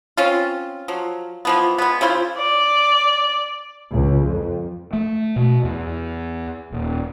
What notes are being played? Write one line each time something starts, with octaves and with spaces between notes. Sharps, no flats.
C4 C#4 F4
F3 F#3
E3 F3 B3
G#3 B3
C#3 E4 F4 C5
D5
C#2
F2
A3
B2
E2
D#1